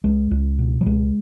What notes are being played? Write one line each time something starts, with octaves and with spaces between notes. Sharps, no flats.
C#2 G#3
C#2
B2
F#3
C#2 G#3